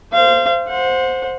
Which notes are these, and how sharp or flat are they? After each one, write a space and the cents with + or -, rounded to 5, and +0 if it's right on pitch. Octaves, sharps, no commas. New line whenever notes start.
C5 -10 F5 -30
C5 +0 F#5 -30